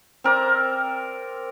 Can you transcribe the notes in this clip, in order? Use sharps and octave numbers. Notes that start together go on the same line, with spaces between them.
C4 A#4 D5